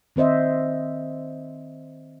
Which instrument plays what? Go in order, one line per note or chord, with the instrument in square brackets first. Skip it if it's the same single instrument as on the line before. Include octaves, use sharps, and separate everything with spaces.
[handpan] D#3 C4 C5 D#5 E5